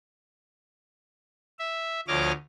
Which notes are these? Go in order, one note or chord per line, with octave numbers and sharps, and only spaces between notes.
E5
D2 F3 C#5 D#5 D6 F6